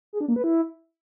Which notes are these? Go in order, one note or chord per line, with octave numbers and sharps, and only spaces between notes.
G#4
D4
A#3
B4
E4